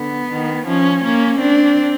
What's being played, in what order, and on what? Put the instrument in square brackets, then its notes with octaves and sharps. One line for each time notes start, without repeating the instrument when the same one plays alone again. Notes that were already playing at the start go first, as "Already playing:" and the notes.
Already playing: [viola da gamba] D3 [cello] B3
[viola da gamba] D#3
[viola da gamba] F3 [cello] C#4
[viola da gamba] A#3 [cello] C#4
[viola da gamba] C4 [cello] D4